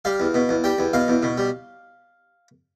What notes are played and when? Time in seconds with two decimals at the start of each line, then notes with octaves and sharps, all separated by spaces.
0.05 G3 F5
0.20 E2
0.34 B2
0.49 E2
0.64 G3 G5
0.79 E2
0.93 B2 F5
1.08 E2
1.23 B2
1.38 G3